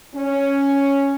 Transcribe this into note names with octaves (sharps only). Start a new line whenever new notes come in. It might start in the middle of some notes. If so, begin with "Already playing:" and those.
C#4